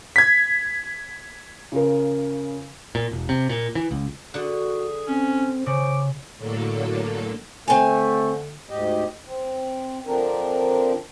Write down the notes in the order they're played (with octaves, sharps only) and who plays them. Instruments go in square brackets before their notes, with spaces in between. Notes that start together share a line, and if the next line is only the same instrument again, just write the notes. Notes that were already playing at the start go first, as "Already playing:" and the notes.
[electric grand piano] G#6 B6
[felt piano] C#3 F4 A#4
[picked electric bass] A#2
E1
C3
A#2
E3
C#2
[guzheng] D3 F#5 [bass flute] F#4 [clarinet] G#4
[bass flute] C4 [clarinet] C#4
[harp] C#3 [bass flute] C5 [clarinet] D6
[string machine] A2 D3 F#3 A#3 A4
[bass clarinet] D3 [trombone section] A3 [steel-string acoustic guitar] C4 G#5
[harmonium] D2 G#2 G4 D#5
C4
D3 F3 C4 D4 A#4